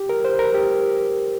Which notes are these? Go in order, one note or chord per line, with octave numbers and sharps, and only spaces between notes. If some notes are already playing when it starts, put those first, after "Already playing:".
Already playing: G4
A#4
C5
A#4
G4